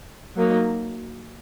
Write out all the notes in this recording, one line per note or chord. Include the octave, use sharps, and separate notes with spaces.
F#3 A#3 D#4